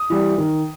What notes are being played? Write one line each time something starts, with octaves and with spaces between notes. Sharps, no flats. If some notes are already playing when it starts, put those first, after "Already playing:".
Already playing: D#6
E3 G3
D#3